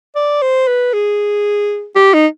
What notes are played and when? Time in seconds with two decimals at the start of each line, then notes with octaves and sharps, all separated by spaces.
0.15 D5
0.42 C5
0.67 B4
0.93 G#4
1.96 G4
2.14 D#4